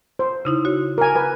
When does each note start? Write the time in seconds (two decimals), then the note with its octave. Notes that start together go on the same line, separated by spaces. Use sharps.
0.19 C5
0.45 C#3 D#4 E4
0.65 F#4 C#5
0.98 A#4 G#5
1.15 A#4 B4 G#5